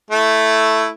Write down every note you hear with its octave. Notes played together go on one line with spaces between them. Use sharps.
A3 E4